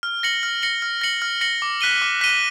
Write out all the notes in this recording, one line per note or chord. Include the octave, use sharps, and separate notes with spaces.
F6
A#6 C#7 F#7
F6
A#6 C#7 F#7
F6
A#6 C#7 F#7
F6
A#6 C#7 F#7
D6
F#6 B6 D#7 G7
D6
F#6 B6 D#7 G7